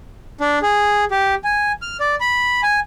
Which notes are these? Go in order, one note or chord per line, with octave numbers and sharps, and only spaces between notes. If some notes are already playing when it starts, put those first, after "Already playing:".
D4
G#4
G4
G#5
F6
D5
B5
G#5